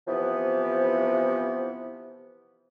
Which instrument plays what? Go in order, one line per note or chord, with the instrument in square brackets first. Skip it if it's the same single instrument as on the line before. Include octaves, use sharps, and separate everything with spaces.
[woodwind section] C3 E3 F3 B3